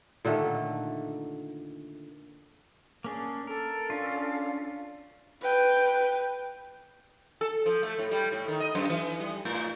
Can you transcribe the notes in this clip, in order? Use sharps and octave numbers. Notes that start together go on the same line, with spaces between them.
A#2 D3 D#3 A3
A#3 C#4 D4 G#4
A4 A#4
C#4 D4 F4 F5
B4 G5
A4
F3
A3
A2
G3
A2
D#3
D#5
F#2
E3
G3
A2